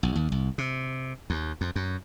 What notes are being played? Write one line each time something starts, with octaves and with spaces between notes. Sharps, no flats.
B1
D#2
C2
C3
D#2
F2
F#2